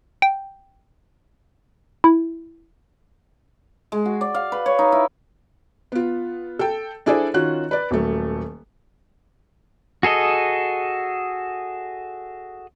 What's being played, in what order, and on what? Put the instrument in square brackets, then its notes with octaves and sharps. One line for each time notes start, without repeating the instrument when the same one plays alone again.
[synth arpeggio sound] G5
E4
[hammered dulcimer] G#3
F#4
D5
F5
B4
C#5
D#4
E4
[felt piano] B3 F4
A4 G5
D4 E4 G#4 A4 C5 D5
D#3 C#4 F4 F#4 F#6
B4 D5
D#1 F#3 A3
[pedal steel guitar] F#4 G#4 A4 D#5